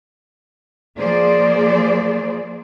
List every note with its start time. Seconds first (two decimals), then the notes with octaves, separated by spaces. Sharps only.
0.97 F3 A#3 G#4 C5 D5